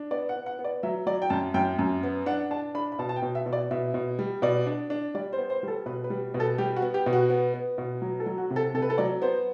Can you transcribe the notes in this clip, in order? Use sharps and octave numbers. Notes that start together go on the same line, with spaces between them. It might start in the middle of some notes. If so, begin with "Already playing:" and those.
Already playing: D4
B3 D5
F#5
B3
F#5
B3
D5
F#3 E5
F#3 D5
G5
F#2 A5
F#2 G5
F#2
B3
D4 F#5
D4 A5
D4 B5
B5
B2 A5
A5
G5
B2
E5
B2
D5
B2 E5
B2
G3
B2 D5
D4
D4
G3 D5
C5
B3
C5
G3 A4
B2 B4
B4
G3
B2
A4
G3 G4
F#4
B3
G4
B2
F#4
B3
B3
B2
F#3
A4
F#3
F#4
C3
A4
C3 A4
B4
A4
F#3 D5
B3 C5